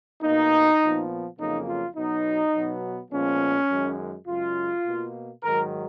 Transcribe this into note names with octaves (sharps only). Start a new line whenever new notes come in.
B2 A#3 D#4
A#2 F3 B3
F2 C#3 F#3 A#3 D#4
F4
B2 F#3 B3 D#4
B2 F#3 B3
A#2 F3 G#3 B3 C#4
F#2 D#3 G#3
F#2 C#3 G#3 F4
B2 A#3
G#2 D#3 F#3 A#4